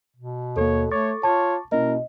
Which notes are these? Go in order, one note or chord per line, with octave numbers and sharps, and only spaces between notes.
B2
D#2 A#3 A4 C#5
A3 C#5 C#6 D6 A6
F4 C#5 A5
B2 A#3 C#4 E4 A#4 D#5